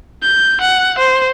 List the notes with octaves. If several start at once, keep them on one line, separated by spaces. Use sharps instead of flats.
G6
F#5
C5